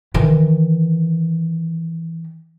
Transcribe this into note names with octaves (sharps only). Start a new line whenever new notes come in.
D#3 E3